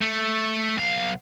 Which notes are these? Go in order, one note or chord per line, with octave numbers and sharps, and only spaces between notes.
A3
B1 F5